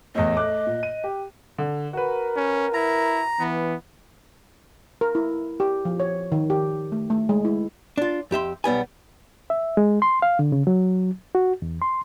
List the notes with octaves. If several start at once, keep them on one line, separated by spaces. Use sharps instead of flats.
E2 A2 D#5
A3 D6 F#6
A#2
D#7
G4
D3
F#4 A#4 B4
C#4
E4 A#5
E3 B3
A#4
E4
G4
F3
C#5
D#3
G4
A3
A3
G#3
E4
D4 F4
F2 G4 E5 C6
B1 G3 B3 G#5
E5
G#3
C6
F5
D3
C#3
F#3
F#4
E2
C6